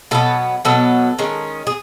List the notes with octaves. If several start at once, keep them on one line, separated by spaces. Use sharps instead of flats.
B2 F#3 B3 A4
B2 F#3 B3 A4
D#3 G#3 C#4
G#4